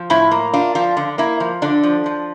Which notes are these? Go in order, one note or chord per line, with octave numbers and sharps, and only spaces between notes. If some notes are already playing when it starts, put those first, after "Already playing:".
Already playing: F3
A2 E4
A#3
D4 F4
F3 F4
D3
A#3 E4
F3
D3 D4
F3
F3